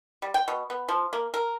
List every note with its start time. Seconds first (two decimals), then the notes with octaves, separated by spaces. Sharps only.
0.22 G3
0.34 G5
0.48 B2
0.70 B3
0.89 F3
1.13 A#3
1.34 A#4